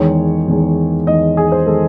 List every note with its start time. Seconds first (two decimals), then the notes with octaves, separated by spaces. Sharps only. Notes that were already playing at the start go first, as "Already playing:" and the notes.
Already playing: E2 D#3 G#3 C#5
0.48 E2 D#3 G#3
1.07 E2 D#3 G#3 D#5
1.37 G#4
1.52 C5
1.67 D#3 G#3 A4